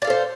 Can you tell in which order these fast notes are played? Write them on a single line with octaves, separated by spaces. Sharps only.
D5 F5 A4 C5